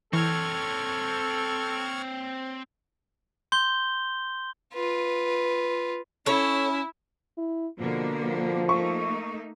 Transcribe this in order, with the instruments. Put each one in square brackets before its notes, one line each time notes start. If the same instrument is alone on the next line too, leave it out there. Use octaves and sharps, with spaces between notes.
[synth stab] E3 [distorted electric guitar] C4 C#5 [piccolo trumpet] A4 [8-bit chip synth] C#6 F6 G#6
[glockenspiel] C6 G6 G7
[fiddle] F4 B4
[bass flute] C#4 [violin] E4 [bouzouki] A4 C#5
[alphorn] E4
[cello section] B2 D3 A#3 [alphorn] F3
[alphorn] F3
[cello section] A3 A#3 D#4 [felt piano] C#6